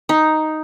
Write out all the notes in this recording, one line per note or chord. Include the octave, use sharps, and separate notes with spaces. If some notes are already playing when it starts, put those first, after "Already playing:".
D#4